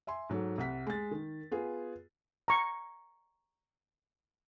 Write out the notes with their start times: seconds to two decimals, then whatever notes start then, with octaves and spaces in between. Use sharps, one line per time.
0.07 E5 G#5 C6
0.29 G#2 F#3 A4
0.58 C2 F#5 B6
0.87 G#3 A6
1.11 D#3
1.51 B3 F4 G#4
2.48 A#5 C#6